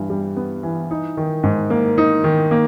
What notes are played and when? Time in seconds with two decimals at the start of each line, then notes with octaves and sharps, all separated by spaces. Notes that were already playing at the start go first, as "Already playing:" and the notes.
Already playing: G2 E3
0.10 G3
0.36 B3
0.63 E3
0.91 D#4
1.17 D#3
1.43 G#2
1.70 A#3
1.98 D#4
2.24 D#3
2.51 A#3